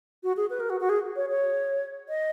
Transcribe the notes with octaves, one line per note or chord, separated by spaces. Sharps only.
F#4
G#4
B4
A#4
F#4
F#4
G#4
C#5
C#5
D#5